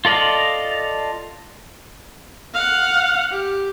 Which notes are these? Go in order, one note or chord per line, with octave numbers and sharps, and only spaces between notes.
F4 A4 D5 D#5 F5
F5 F#5
G4